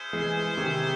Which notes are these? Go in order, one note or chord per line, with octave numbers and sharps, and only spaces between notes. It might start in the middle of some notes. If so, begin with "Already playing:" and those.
Already playing: C#4 E4 G#4 C5
E3 G#3
C3 D#3